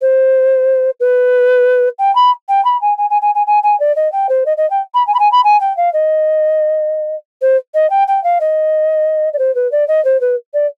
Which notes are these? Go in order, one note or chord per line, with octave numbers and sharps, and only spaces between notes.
C5
B4
G5
B5
G5
B5
G#5
G#5
G#5
G#5
G#5
G#5
G#5
D5
D#5
G5
C5
D#5
D#5
G5
B5
G#5
B5
G#5
B5
G#5
G5
F5
D#5
C5
D#5
G5
G5
F5
D#5
D5
C5
B4
D5
D#5
C5
B4
D5